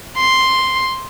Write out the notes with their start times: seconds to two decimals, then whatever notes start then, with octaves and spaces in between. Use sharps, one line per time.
0.17 C6